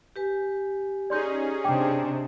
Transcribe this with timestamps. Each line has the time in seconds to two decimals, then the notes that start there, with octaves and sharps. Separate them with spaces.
0.16 G4 B4 G#5
1.10 C#4 D#4 G#4 D5 C6 G6
1.64 C3 D4 G5 D6